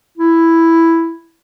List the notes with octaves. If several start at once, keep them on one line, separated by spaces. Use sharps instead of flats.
E4